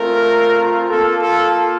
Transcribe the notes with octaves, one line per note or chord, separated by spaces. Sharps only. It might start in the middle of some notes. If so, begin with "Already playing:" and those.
Already playing: A3 C4 F4 A#4
A#3 F4 A4
A4